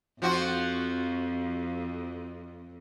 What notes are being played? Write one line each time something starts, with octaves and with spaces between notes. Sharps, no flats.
F2 F3 F4 F#4